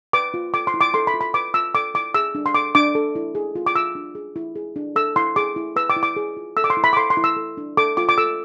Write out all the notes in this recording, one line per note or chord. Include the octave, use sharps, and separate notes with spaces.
B4 D6
F4
A4 D6
C6
E4
D6
A4 C6
B5
F4
B5
B4 D6
F4 E6
A4 D6
E4 D6
G#4 E6
D4
C6
A4 D6
D4 D6
A4
E4
G#4
F4
D6
F4 E6
D4
G#4
E4
G#4
D4
A4 E6
E4 C6
G#4 D6
E4
B4 E6
D6
E4
D6
G#4
F4
A4 E6
D6
C6
E4
B5
D6
A4 C6
C6
E4
E6
A4
D4
A4 D6
F4 D6
D6
A4 E6